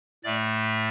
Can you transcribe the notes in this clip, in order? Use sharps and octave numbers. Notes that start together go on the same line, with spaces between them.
A2 A3 D5